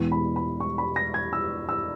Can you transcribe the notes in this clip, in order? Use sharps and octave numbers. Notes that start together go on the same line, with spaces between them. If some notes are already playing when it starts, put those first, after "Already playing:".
Already playing: E2 B2 G#3
B5
B5
C#6
B5
A#6
G#6
E6
E6